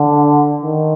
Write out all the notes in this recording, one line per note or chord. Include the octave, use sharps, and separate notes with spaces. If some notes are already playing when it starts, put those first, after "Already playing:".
Already playing: D3
D#3